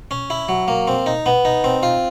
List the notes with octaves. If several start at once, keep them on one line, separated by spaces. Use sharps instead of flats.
C#4
E4
F#3
A#3
C4
D#4
B3
D#4
C4
F4